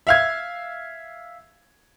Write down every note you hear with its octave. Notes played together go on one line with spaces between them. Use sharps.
E5 F5 G#6